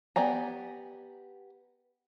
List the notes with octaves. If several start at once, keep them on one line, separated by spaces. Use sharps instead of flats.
B3 G4 D5 G#5 A#5